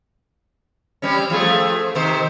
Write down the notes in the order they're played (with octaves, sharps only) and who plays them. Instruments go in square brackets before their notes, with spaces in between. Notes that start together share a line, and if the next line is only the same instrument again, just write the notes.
[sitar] G3 C4 C#4
F3 A3 G#4
C3 D#3 C5